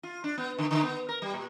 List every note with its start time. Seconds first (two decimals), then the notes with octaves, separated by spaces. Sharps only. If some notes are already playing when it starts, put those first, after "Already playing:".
0.03 F4
0.24 D4
0.38 B3
0.59 D3
0.71 D3
0.83 B3
1.09 A#4
1.22 G3
1.34 A#2